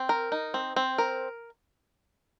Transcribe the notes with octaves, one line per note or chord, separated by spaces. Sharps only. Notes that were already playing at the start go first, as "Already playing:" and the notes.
Already playing: C4
A#4
D#4
C4
C4
A#4